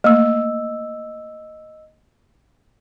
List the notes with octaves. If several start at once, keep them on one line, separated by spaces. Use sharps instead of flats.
A3 A#3 D#5 E6